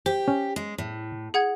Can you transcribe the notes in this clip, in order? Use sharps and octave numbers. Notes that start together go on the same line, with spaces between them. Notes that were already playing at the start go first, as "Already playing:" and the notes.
G4 C5
C#4
G#3
A2
G#4 F#5 G#6